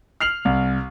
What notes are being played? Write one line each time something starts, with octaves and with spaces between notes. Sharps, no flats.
F6 C7 F7 F#7
C2